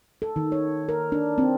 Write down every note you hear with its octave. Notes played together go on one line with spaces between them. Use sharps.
A4
D#3
C#5
A#4
D4
C4